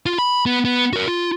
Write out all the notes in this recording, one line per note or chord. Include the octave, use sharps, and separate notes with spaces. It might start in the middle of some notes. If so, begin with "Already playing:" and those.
F4
B5
B3
B3
F#4 A#4
F4